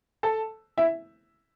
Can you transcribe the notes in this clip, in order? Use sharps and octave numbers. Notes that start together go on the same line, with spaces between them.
A4 A5
E4 E5